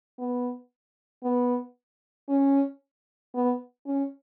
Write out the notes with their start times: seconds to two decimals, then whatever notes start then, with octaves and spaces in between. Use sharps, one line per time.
0.19 B3
1.24 B3
2.29 C#4
3.35 B3
3.87 C#4